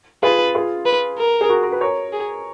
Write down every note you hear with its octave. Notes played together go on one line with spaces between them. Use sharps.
F4 G#4 B4
F4 G#4
B4
A#4
G#4
F#4 A#4
A#4
B4
A#4 C#5
G#4